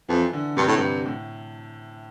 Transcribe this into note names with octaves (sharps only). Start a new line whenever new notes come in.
F2 E3
D3
G2 C3
A2
G2
A2